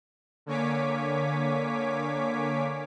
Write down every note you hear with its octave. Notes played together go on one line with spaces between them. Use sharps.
D3 A#3 C#5 G#5 D6 B6